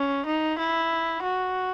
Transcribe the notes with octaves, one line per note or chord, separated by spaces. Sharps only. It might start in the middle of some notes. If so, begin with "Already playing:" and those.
Already playing: C#4
D#4
E4
F#4